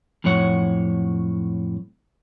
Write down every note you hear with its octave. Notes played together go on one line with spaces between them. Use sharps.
F2 A2 F#3 C#5 F#5